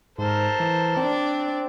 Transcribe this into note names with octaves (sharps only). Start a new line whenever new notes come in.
G#2 A4 A#4 C5
E3
C4 D4 D5